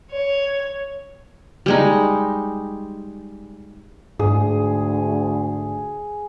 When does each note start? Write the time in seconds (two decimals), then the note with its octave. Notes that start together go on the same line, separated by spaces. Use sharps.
0.11 C#5
1.66 G3 G#3 D#4
4.19 D2 G#2 G#4